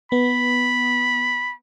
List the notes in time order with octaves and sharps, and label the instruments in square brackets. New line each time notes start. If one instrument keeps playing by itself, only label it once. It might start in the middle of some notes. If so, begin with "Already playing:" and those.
[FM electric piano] B3 [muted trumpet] B5